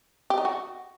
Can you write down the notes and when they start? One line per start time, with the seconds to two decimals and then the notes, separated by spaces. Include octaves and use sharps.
0.30 G4
0.38 D#4
0.45 F#4